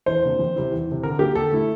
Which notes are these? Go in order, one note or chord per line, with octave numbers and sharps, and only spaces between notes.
E2 C5
C3 E3 A#3 D4
F2
C3 G3 C4 E4
E2
C3 E3
D3 A#4
G3 A#3 G4
D3 A4
A3 E4